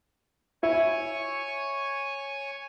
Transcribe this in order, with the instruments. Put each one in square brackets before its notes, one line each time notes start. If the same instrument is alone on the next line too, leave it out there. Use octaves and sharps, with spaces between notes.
[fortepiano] E4 [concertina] C#5 G#5 C#6